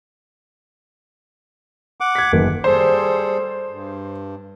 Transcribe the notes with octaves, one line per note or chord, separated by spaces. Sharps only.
F#5 D6
G#6 B6
F#1 D#3 B4
G3 G#4 A4 C5
G2